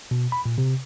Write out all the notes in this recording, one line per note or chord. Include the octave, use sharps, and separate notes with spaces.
B2
B5
A#2
C3